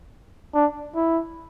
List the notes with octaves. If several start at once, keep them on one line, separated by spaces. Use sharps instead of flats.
D4
E4